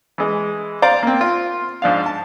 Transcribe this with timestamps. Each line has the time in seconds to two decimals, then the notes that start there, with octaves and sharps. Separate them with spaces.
0.18 E3 G#3
0.82 C5 D5 F5 A#5
1.03 A#3 C4
1.21 F4
1.82 G#2 F3 D4 F5
2.06 A5